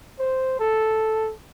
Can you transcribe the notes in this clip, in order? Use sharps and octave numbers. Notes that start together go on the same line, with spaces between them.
C5
A4